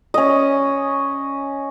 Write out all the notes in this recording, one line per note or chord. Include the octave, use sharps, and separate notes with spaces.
C#4 D#5